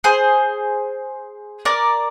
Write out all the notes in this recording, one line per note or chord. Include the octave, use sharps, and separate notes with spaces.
G#4 C5
A#4 D5